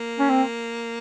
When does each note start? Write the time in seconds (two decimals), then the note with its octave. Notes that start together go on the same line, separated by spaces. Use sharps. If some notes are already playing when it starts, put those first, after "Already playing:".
Already playing: A#3
0.19 C#4
0.29 C4